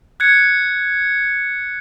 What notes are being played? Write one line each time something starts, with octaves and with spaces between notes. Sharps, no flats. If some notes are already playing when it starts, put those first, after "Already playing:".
F#6 G#6 C#7